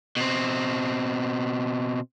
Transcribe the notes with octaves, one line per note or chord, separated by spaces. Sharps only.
B2 C4